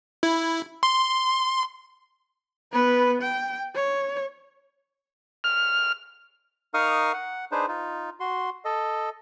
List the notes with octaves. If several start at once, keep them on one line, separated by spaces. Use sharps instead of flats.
E4
C6
B3 B4
G5
C#5
F6
D#4 A#4 F5 C#6 D#6 F6
F#5
D4 D#4 G#4 B4 C5
D#4 F4
F#4 C6
A4 D#5